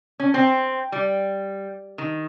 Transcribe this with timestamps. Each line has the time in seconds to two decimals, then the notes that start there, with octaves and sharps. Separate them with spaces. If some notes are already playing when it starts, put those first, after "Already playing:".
0.20 C#4
0.34 C4
0.92 G3
1.98 D#3